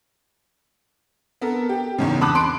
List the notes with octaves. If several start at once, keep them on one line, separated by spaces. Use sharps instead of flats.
B3 A4 A#4
G4
E2 G#2 C#3
A5 B5 D6 D#6 F#6
C6 D7